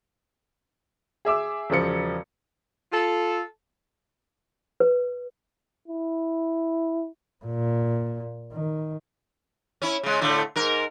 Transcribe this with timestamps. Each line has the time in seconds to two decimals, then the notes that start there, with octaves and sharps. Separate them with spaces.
1.25 G#4 E5 D6 E6
1.70 E1 C#3 F3 C#7
2.92 F4 A4
4.80 B4
5.88 E4
7.45 A#2
8.53 D#3
9.82 C#4 E4
10.03 C#3 G#3
10.21 A2 D3 A3
10.56 G#2 A#4